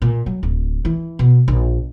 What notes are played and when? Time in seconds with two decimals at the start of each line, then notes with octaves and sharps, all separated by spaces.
0.02 A#2
0.26 F#3
0.43 D1
0.85 E3
1.19 B2
1.48 A#1